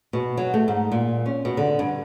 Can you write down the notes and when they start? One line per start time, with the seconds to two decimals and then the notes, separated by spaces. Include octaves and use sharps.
0.13 B2
0.37 F#3
0.54 A3
0.68 G#2
0.92 A#2
1.26 C#4
1.45 B2
1.57 D3
1.79 G2